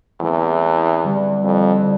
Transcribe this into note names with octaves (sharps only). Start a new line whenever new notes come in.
E2 A3 C4 E4
D3 G3 D4
F2
D3